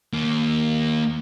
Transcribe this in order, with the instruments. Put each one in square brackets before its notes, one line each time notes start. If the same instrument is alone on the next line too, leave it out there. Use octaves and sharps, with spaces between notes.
[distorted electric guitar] D#2 A#3